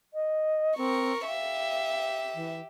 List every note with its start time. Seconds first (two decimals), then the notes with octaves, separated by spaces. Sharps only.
0.14 D#5
0.77 C4 A#4 C#6
1.27 G4 E5 F5
2.34 E3